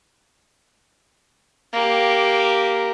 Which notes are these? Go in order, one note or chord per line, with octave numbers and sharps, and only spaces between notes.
A#3 G4